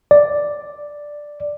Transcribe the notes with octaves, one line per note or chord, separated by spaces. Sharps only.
D5